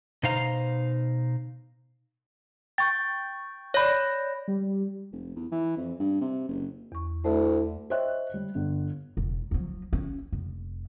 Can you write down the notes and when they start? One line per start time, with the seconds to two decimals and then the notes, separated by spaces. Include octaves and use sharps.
0.23 B2 D#4 C5 F5 A#5
2.78 G5 C#6 G6 A6
3.74 C#5 D5 B5 G6 A#6
4.48 G3
5.12 F1
5.36 E2
5.52 E3
5.77 F2
6.00 G2
6.21 C3
6.48 F#1
6.92 E2 C#6
7.25 D2 A3 E4
7.90 C5 C#5 D#5 E5 G5 F#6
8.34 G3
8.55 G1
9.17 E1
9.51 F3 F#3
9.93 C#4
10.32 F1